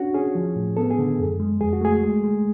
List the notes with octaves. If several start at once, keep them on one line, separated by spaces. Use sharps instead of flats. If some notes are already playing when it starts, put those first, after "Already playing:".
Already playing: C#4 D4 F#4
C#4 G#4
F3
A2
B3 A4
G#4
D3
F#2
G#3
F2 G#4
F#4
A3 G#4
G#3
G#3